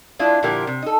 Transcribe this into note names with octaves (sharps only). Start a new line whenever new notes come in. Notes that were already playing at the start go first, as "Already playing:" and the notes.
G#3 D4 E4 F4
A#2 D3 F3 E4 G4 A#4
C3
D#4 A4